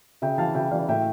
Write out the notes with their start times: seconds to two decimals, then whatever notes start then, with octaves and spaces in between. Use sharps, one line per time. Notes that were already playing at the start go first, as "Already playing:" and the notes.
0.22 C#3 E5 G5
0.38 E3 F5 A5
0.54 C#3 E5 G5
0.71 E3 D5 F5
0.89 A2 E5 G5